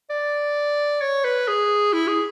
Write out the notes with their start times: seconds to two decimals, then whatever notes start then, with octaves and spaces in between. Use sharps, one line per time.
0.10 D5
1.01 C#5
1.24 B4
1.48 G#4
1.93 E4
2.08 G#4